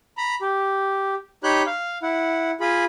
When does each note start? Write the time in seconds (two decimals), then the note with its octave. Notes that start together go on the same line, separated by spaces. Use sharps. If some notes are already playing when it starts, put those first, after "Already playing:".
0.17 A#5 B5
0.42 G4
1.44 D#4 G4 C#5 B5 F#6 G6
1.67 F5
2.02 E4 F#5
2.60 F4 G#4 B5